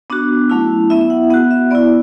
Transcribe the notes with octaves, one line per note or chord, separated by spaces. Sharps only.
B3 D4 F#4
F#3 A3 C#4 E4
B3 E4 E5
E5
F#5
B3 F#4 F#5
E5
B3 E4 D5